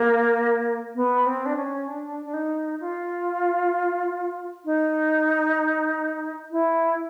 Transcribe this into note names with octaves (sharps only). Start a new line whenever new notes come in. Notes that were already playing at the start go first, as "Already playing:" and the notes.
Already playing: A#3
B3
C4
D4
C#4
D4
D4
D#4
F4
D#4
E4